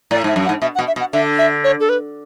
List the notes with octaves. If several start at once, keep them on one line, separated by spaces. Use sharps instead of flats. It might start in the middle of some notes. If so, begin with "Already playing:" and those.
A2 D5
G#2 E5
F#2
F#5
G#2
B2 E5
F#5
B2
E5
B2
F#5
D3 E5
E5
C#5
A4
B4